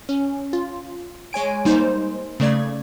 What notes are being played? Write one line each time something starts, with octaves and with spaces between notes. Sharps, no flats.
C#4
F4
G#3 C#5 G#5 D7
G3 A#3 D#4 C5
C#3 A3 D5 G#6